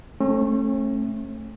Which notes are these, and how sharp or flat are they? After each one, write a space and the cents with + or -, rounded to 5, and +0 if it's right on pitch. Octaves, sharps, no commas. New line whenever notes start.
A3 +0 C#4 -45